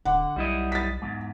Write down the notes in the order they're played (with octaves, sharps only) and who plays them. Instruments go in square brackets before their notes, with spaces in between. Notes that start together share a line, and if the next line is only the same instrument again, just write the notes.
[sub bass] D1 [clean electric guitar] D3 [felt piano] F#5
[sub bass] B1 [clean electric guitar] G3 E4 D#5
[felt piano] A6 B6
[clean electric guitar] E2 G#2